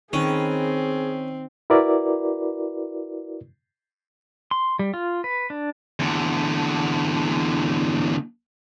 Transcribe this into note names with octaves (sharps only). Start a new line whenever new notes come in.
D#3 C4 C#4 G#4 B4
E4 F#4 A#4 B4 D5
C6
G3
F4
B4
D4
E2 D3